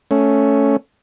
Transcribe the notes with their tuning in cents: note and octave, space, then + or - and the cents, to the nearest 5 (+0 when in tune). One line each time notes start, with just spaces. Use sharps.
A3 +0 C#4 +0